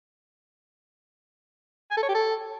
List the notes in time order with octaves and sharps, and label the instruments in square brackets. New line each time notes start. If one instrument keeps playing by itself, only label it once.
[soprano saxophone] G#5
A4
C#5
G4
A4